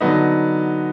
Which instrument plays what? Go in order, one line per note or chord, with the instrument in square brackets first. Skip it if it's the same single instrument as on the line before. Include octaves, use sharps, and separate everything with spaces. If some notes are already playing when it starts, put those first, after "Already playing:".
[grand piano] D3 F#3 B3 D#4